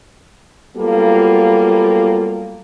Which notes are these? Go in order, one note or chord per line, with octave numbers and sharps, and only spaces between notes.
F#3 G3 A#3 B3 F4 A4